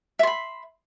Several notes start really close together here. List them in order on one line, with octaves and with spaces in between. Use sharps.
E5 C6 B5